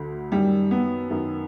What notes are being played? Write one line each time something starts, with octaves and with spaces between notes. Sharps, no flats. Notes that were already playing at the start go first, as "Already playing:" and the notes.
Already playing: D2 D3
F#2 D#3 G3
B3
F#2 D#3